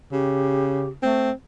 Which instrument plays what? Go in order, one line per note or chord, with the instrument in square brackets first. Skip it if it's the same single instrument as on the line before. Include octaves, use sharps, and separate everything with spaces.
[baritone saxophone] C#3 [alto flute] G4
[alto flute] A3 [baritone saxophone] C4